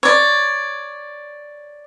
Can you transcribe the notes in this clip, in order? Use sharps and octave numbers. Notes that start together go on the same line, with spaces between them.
C#5 D5